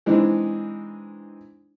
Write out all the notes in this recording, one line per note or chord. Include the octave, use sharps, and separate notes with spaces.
E3 G#3 C4 D4 D#4